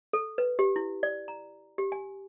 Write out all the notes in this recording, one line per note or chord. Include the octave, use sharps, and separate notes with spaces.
A4
B4
G4
E4
D5
A#5
G4
G#5